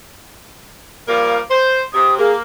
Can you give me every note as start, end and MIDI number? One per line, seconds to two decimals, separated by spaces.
1.06 1.38 53
1.06 1.38 55
1.06 1.38 58
1.50 1.82 72
1.94 2.17 48
1.94 2.15 87
2.19 2.42 58
2.19 2.33 68